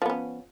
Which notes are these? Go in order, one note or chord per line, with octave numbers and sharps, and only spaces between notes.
F3 B3 C#4